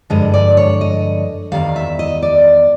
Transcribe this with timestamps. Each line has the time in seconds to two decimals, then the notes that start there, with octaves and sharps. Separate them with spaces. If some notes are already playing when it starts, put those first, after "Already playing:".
0.10 G2 D3 F3 G#3 D#5
0.34 D5
0.57 C#5
0.81 D#5
1.52 E2 C3 D#3 G3 F5
1.76 E5
1.99 D#5
2.22 D5